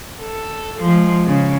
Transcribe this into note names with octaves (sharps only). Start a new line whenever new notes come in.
A4
F3 G#3
C#3